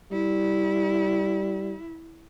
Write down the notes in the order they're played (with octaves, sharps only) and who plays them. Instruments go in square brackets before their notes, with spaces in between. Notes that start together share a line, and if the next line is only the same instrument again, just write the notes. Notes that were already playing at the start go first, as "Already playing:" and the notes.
[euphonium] G3 [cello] E4